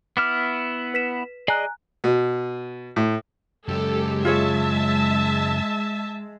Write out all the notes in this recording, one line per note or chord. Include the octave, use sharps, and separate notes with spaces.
B3 E4 D6 F6
B4 B6 E7
G#4 D5 D#5 G#5 A#5 F#6
B2
A2
F#2 C#3 G#3 G4 A4
F4 G#4 C#5 E5 A5